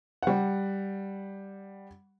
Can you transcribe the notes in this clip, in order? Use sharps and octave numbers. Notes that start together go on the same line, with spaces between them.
G3 F#5